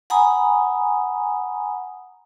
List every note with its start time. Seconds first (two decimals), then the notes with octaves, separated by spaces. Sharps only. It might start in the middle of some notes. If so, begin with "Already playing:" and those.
0.10 F#5 G#5 A#5 B5 D#6